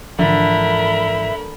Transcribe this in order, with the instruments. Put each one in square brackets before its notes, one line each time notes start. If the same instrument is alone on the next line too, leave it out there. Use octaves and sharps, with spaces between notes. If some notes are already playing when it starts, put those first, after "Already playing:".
[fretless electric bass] G#2 E3 F3 [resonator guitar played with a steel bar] D3 [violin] A#4 B5 [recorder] E5